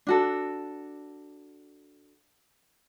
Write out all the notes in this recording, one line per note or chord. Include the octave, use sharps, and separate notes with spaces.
D4 F#4 A4